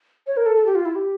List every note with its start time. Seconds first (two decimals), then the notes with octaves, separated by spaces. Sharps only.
0.27 C#5
0.37 A#4
0.46 A4
0.56 A4
0.66 G4
0.75 F4
0.85 E4
0.95 G4